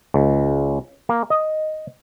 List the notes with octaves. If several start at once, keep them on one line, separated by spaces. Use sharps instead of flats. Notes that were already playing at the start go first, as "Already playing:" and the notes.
C#2
A#3
D#5